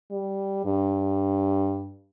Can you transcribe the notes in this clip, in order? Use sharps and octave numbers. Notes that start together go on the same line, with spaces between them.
G3
G2